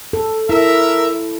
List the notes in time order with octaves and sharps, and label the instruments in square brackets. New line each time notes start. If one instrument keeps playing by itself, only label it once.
[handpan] A4
[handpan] E4 [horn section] A#4 E5